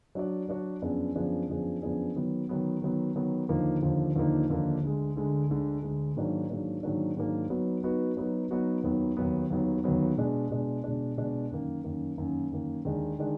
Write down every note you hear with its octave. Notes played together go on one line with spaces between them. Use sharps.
F#3 D4 F#4 D5
F#3 D4 F#4 D5
F#2 F3 B3 D4 G#4
F#2 F3 B3 D4 G#4
F#2 F3 B3 D4 G#4
F#2 F3 B3 D4 G#4
D#3 F#3 B3
D#3 F#3 B3
D#3 F#3 B3
D#3 F#3 B3
D#2 D3 F3 A#3 D#4
D#2 D3 F3 A#3 D#4
D#2 D3 F3 A#3 D#4
D#2 D3 F3 A#3 D#4
D2 D3 G#3
D2 D3 G#3
D2 D3 G#3
D2 D3 G#3
G#2 D#3 F#3 A#3 D4
G#2 D#3 F#3 A#3 D4
G#2 D#3 F#3 A#3 D4
G#2 D#3 F#3 A#3 D4
F#3 B3 D#4 F#4 B4
F#3 B3 D#4 F#4 B4
F#3 B3 D#4 F#4 B4
F#3 B3 D#4 F#4 B4
D#2 D#3 F#3 B3
D#2 D#3 F#3 B3
D#2 D#3 F#3 B3
D#2 D#3 F#3 B3
B2 G#3 D4
B2 G#3 D4
B2 G#3 D4
B2 G#3 D4
F#2 D#3 A#3
F#2 D#3 A#3
F#2 D#3 A#3
F#2 D#3 A#3
D#2 D#3 G#3 D4
D#3 G#3 D4